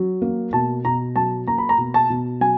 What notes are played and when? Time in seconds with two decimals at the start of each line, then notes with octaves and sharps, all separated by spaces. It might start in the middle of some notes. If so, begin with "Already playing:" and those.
Already playing: F#3
0.22 A#3
0.53 B2 A5
0.85 B2 A#5
1.16 F#3 A5
1.47 A#3 A#5
1.58 B5
1.69 A#5
1.78 B2
1.94 A5
2.10 B2
2.41 F#3 G#5